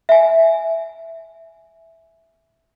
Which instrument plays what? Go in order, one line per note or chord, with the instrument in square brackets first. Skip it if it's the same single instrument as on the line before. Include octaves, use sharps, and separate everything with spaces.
[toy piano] E5 G#5